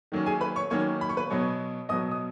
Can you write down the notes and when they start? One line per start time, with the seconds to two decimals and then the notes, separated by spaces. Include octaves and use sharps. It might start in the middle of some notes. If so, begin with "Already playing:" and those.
0.12 D#3 F#3 A#3 C#4
0.26 G#4 G#5
0.41 B4 B5
0.56 C#5 C#6
0.70 D#3 F#3 A#3 C#4 C#5 C#6
1.01 B5
1.09 C#6
1.17 B4 B5
1.30 B2 F#3 B3 C#5 C#6
1.89 B2 F#3 B3 D#5 D#6
2.11 D#6